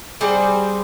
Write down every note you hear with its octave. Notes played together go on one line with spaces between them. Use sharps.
G3 C4 G#4 C5